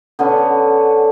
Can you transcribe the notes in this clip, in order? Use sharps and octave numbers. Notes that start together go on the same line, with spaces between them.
D3 B3 C#4